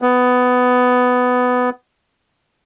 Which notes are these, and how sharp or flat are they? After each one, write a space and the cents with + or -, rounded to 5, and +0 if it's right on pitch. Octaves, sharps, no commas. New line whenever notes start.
B3 +15